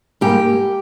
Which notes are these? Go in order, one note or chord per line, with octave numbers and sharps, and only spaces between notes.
G#2 G3 A#3 G4